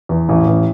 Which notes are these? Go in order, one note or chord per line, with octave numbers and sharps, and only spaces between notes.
E2
A1
A1